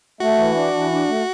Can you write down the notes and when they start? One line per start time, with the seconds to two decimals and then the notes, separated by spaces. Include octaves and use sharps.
0.20 A3 F#4
0.38 E3
0.56 D4
0.74 E3
0.92 D4
1.09 A3